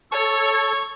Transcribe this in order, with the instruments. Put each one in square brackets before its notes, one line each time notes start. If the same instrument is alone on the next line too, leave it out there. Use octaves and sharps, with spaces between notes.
[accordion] A4 [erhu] C#5 [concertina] C#6